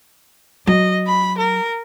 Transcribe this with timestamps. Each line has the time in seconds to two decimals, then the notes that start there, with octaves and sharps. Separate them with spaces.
0.67 F#3 D#5
1.06 B5
1.37 A#4